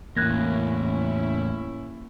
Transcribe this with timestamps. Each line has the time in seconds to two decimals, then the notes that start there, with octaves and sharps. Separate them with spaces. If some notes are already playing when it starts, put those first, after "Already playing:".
0.17 E2 A2 A#3 C#4 E4 F#6 G#6 A#6